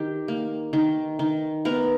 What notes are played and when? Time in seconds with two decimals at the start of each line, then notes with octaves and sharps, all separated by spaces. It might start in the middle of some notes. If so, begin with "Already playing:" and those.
Already playing: D#3 G4
0.28 A#3
0.73 D#3
1.19 D#3
1.65 B3 A#4